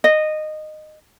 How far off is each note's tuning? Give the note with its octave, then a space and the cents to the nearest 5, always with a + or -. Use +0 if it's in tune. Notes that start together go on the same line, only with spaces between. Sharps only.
D#5 -15